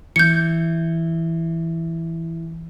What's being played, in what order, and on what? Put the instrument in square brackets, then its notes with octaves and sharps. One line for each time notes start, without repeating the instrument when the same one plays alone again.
[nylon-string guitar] E3 [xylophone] G6 C#7